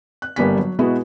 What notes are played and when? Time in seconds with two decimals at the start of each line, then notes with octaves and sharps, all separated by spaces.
0.22 F#6
0.36 G1 G3 A#3 B3 G#5 B6
0.58 F#3
0.79 B2 G#3 B3 E4 F#4